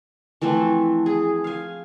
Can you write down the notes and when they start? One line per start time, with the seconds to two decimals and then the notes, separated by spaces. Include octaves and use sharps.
0.41 E3 F3 A3 C4
1.06 G#4
1.44 F5 G#5